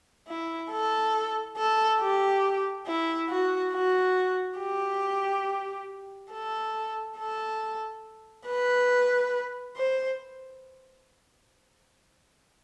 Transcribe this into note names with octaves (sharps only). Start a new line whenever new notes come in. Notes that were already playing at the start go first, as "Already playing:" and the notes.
E4
A4
A4
G4
E4
F#4
F#4
G4
A4
A4
B4
C5